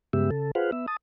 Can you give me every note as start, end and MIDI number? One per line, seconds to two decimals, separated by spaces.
0.13 0.30 43
0.13 0.30 49
0.13 0.30 56
0.13 0.30 59
0.13 0.30 67
0.13 0.30 76
0.31 0.51 49
0.31 0.51 69
0.55 0.71 65
0.55 0.71 68
0.55 0.71 71
0.55 0.71 72
0.55 0.71 77
0.55 0.71 78
0.72 0.86 59
0.72 0.86 76
0.88 0.97 81
0.88 0.97 87